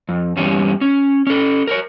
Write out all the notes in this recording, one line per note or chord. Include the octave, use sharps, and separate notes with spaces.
F2
E2 G2 G3 C#4
C#4
C#4 A4
A#4 B4 C#5